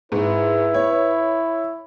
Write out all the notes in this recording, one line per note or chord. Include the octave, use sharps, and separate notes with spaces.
G#2 E4 B4
C#5